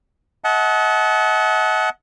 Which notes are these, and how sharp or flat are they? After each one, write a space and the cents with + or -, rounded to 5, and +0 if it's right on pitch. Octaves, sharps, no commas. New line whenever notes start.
D#5 +40 F#5 +0 A5 -30